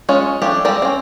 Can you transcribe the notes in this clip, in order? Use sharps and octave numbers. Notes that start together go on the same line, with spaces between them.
G#3 C#4 F4 C#5
F3 A3 C#4 D4 G4
G3 G#3 C4 G4 D5
C4 C#4